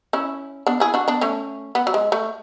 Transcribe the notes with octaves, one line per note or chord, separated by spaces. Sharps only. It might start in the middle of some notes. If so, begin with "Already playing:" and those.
C#4 E4
B3 D4
E4 G#4
D4 F#4
B3 D4
A3 C#4
B3
F#3
G#3
A3